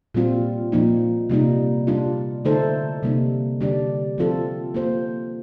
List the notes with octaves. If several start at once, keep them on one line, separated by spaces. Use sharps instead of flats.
A#2 G3 C4 F4
A#2 F3 A#3 D#4
C3 G3 A#3 D#4
G3 D4 F4
D3 A3 D#4 A4 C5
C3 G3 A#3 D#4
D3 G3 D4 G4 D5
F3 A3 C4 F4 A4
A#3 F4 C5